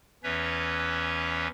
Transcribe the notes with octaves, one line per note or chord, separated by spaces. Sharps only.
E2 E3 C#4 B4 C#5 E5